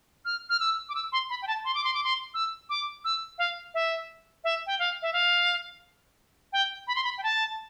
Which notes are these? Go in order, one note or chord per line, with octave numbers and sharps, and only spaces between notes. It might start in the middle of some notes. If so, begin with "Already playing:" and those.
F6
F6
E6
D6
E6
C6
B5
G5
A5
C6
D6
C6
D6
C6
E6
D6
E6
F5
E5
E5
G5
F5
E5
F5
G5
B5
C6
B5
G5
A5